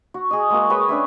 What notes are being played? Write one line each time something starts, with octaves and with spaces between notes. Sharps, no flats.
F#4
G#4 D#5
G#3 A#3 F#4
B4 C#5 D#5 G5
C#4 D4 B4 E5